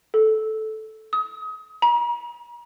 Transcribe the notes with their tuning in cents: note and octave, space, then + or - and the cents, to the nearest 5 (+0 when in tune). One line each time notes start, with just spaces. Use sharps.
A4 -10
D#6 +30
A#5 +40